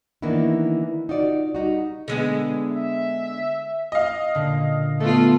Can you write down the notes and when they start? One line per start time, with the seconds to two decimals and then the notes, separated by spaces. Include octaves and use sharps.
0.22 D#3 E3 A#3 B3 D4 E4
1.09 D#4 F4 F#4 D5
1.55 G3 D#4 F#4
2.08 D3 G#3 B3
2.72 E5
3.92 D#5 F5
4.35 A#2 D3
5.00 A3 B3 F4 A4